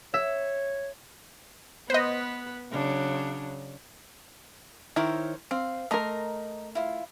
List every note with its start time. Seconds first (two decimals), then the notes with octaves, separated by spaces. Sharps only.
0.14 C#5 E5
1.90 B3 B4 C5 D#5
2.72 C#3 F#3 D4
4.96 D#3 E4 A#4 C5 C#5
5.51 C4 F5
5.91 A3 A#4 D#5 A#5 C6
6.75 E4 F4